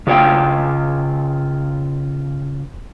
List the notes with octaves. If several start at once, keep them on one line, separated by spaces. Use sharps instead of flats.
C#3 F4 F#4 C#5 F5 G5